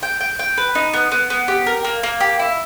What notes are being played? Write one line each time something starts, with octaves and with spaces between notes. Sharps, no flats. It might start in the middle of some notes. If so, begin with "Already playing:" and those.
G5
G5
G5
B4
D#4
B3
B3
B3
G4
A#4
A#3
A#3
G4
E4